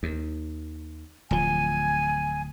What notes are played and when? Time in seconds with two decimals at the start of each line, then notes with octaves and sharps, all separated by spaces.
0.03 D#2
1.31 D1 F3 G#5